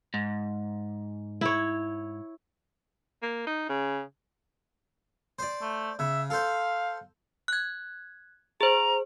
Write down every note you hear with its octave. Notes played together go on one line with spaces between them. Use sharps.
G#2
E4 C#5
A#3
D#4
C#3
C5 D5
A3
C#3 E5
A4 C5 F5
F#6 G#6
G#4 C5 A#5